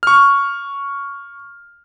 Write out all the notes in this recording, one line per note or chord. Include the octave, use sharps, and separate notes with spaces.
C#6 F6